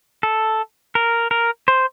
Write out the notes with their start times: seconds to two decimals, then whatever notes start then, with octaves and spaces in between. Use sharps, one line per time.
0.23 A4
0.95 A#4
1.31 A#4
1.68 C5